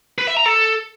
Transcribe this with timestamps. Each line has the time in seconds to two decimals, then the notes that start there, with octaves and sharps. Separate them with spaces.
0.18 B4
0.28 E5
0.37 A#5
0.46 A4